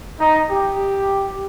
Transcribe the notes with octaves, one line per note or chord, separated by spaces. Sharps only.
D#4
G4